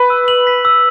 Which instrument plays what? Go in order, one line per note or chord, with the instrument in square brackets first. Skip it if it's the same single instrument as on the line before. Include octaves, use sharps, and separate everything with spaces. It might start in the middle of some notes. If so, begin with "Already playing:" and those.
Already playing: [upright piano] B4
[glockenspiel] E6
F#7
B6
E6